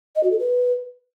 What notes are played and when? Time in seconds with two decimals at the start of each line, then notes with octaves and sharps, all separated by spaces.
0.16 D#5
0.23 F#4
0.31 A4
0.39 B4